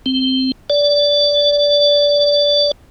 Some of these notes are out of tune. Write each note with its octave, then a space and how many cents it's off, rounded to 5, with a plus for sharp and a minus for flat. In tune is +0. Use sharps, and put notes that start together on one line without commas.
C4 -5
D5 -20